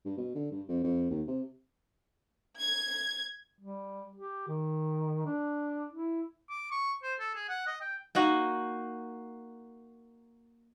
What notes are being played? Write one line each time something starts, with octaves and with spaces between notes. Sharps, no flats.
G2
B2
D3
G2
F2
F2
D#2
C3
G#6
G3
G4
D#3
D4
E4
D6
C#6
C5
A4
G#4
F#5
D#5
G5
A#3 D#4 F#4